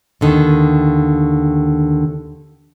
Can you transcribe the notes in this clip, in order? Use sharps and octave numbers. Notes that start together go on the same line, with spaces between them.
D#2 D3 D#3